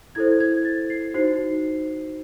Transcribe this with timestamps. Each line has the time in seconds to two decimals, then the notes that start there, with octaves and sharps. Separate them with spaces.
0.15 E4 A4 C5 G#6
0.40 G#6
0.65 A6
0.90 C7
1.14 D#4 F#4 C5 C7